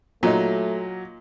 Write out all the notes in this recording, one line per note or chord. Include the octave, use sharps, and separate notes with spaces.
A#2 F#3 A3 D#4